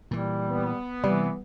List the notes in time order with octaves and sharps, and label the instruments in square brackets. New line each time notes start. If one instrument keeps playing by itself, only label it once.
[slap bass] A#2 E3 [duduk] G3
[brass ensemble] B3
[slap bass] C3 [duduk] E3 [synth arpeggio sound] G3